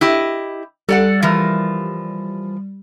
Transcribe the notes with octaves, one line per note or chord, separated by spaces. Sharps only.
E4 G4 D#5
G3 A4 D5 F#5
E3 F3 A#4